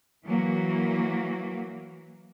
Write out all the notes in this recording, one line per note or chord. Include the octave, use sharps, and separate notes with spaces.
E3 F#3 A#3